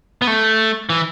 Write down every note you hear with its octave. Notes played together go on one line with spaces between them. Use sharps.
B3
A3
E3